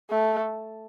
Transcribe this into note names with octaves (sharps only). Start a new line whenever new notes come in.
A3